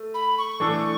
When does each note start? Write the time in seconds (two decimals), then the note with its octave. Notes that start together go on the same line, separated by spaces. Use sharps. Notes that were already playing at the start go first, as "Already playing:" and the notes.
Already playing: A3
0.14 B5
0.38 C#6
0.60 E3 A3 D4 A4